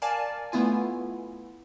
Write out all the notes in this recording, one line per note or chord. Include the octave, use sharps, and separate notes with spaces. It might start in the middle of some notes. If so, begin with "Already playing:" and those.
A#4 D5 F5 G#5 A5
A3 B3 E4 F4 G#5